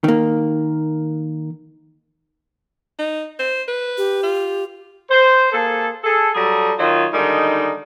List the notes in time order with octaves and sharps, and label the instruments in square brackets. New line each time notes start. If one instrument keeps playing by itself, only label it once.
[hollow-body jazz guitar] D#3 A#3
[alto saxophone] D#4
C5
B4
[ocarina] G4
[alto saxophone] F4
[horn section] C5
A#3 G#4 A4
G#4 A4
F#3 G3 G#4 A4 A#5
D#3 F#3 D#4 F4
D3 D#3 G3 G#3 D#4